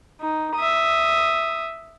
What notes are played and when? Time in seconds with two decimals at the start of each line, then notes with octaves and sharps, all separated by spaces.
0.21 D#4
0.55 E5 D#6